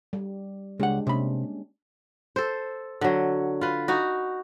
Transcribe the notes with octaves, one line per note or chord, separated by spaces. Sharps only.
G3
C#2 G#3 D4 G4 F#5
C3 A#3 C#4 D4 B5
A4 C5
D3 F#3
F4 B4
D#4 F#4